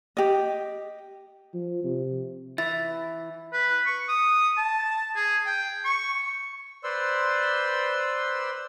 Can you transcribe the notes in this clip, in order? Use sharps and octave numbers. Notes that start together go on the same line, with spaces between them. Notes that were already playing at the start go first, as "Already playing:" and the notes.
G4 D#5
F3
C3
E3 E5 A6
B4
C#6
D#6
A5
G#4
G5
C#6
B4 C5 D5 C6 E6